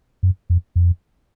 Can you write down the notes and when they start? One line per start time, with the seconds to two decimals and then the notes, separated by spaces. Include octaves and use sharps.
0.23 F#2
0.50 F2
0.76 F2